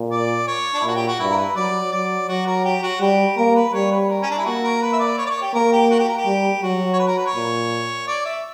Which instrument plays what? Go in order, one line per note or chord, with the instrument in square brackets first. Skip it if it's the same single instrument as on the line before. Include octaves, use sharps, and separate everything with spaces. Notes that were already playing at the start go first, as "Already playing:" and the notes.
Already playing: [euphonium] A#2
[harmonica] D5
C#5
D4
E4
[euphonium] A#2 [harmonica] F#4
[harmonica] G4
F#4
[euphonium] G2 [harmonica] E4
[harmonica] A#4
B4
[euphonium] F#3 [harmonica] D5
[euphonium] F#3 [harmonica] D5
[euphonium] F#3 [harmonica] F#4
[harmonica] A#4
G4
F#4
[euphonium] G3 [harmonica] G4
[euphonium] A#3 [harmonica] A#4
[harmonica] B4
[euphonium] G3 [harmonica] C#5
[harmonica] B4
A#4
C#4
D4
E4
[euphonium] A#3 [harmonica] F#4
[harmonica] A#4
B4
E5
D5
C#5
D5
C#5
G4
[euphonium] A#3 [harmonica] A#4
[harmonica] G4
F#4
G4
A#4
G4
[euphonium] G3
[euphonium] F#3 [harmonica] F#4
[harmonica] C#5
B4
A#4
B4
C#5
[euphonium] A#2
[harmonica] D5
E5